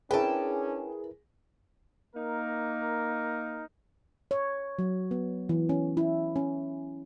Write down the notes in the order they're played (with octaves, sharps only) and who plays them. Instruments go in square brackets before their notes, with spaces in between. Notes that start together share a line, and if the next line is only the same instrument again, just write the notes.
[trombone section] C#4 D4 [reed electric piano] E4 A#4 B4 [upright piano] G#4 [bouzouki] G5 A5
[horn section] A#3 D#4 A#4
[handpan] C#5
F#3
B3
E3
C#4
E4
C#4